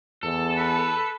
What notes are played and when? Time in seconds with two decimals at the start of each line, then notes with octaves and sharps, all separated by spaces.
0.23 E2 A4
0.57 B4